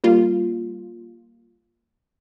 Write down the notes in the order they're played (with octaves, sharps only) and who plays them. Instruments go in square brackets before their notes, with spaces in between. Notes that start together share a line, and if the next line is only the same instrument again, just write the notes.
[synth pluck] G3 A#3 F4